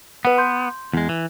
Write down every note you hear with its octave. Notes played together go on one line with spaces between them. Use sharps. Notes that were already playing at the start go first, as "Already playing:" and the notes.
B3 B4 F#5
C6 G6
E2 G#3
E3